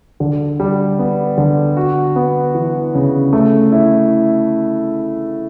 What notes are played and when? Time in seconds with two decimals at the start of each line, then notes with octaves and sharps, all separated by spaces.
0.20 D3
0.60 G3
0.99 B3
1.38 D3
1.77 F#4
2.16 B3
2.54 E3
2.95 C#3
3.33 A3
3.72 E4